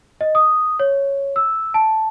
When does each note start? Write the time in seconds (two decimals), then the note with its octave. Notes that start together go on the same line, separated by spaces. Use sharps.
0.21 D#5
0.35 D#6
0.80 C#5
1.36 E6
1.74 A5